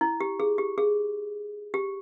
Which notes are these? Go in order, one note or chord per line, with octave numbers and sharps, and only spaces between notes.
E4
G4
G#4
G4
G#4
G4